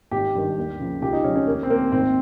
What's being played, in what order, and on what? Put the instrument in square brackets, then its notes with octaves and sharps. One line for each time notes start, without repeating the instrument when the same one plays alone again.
[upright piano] G#1 G4
G2 D#3
D#2
C#3 F3
C#2 G4
D#4
C#3 F3 C#4
C#4
D#2 A#3
C4
D#3 A#3
G#1 C4